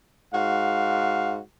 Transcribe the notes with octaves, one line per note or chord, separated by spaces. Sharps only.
G#2 F#4 F5